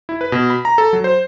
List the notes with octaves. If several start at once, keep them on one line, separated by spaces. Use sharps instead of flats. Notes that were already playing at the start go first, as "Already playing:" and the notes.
E4
B4
B2
B5
A#5
A4
F#3
C5